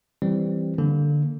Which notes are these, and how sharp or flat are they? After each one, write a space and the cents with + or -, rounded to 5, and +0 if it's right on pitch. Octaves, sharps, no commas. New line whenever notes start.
E3 +5 G3 +0 C4 +10
D3 +5 A#3 +0